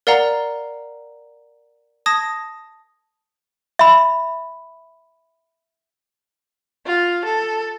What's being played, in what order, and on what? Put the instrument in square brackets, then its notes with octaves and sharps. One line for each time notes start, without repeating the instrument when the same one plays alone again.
[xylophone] A#4 D5 F5 F#5 A#5
A5 D#6 G#6 A#6
[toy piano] E5 B5
[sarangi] F4
A4